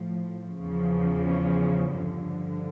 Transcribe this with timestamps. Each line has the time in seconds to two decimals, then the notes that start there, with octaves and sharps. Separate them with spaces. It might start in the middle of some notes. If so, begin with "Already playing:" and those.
Already playing: A2 F3
0.60 E2 C#3 F3
1.27 C#4
1.93 G2 D3 F3